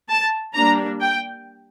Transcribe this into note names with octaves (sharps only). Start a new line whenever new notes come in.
A5
G3 A#3 D4 A#5
G5